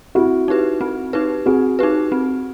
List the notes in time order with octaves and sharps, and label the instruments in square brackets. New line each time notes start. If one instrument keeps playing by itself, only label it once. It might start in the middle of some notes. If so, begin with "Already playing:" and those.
[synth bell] C4 [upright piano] E4 F#4
[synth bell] D#4 G4 B4
C4
D#4 G4 B4
[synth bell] C4 [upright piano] F#4 G#4
[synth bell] D#4 G4 B4
C4